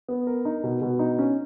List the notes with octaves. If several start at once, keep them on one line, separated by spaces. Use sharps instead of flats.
B3
A#4
D#4
B2
B2
D#4
C#4